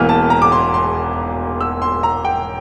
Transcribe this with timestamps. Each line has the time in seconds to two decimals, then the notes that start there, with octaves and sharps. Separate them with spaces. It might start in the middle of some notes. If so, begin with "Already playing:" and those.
Already playing: E1 E2 E3 A#3 F6
0.09 A5
0.30 A#5
0.42 D6
0.52 C6
0.74 C6
1.61 E6
1.82 C6
2.03 A#5
2.25 G5